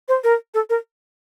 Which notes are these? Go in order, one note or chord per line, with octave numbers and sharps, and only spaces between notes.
C5
A#4
A4
A#4